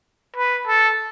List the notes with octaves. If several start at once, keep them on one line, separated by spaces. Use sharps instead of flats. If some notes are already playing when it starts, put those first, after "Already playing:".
B4
A4